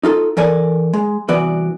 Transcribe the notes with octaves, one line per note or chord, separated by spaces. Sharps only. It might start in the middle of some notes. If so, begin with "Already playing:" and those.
D#4 F4 A4
E3 A4 A#4 D5 G#5
G#3
C2 E3 B3 F#4 D5